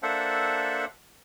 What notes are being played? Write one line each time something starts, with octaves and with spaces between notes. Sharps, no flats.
A#3 D4 A4 C5 E5 F#5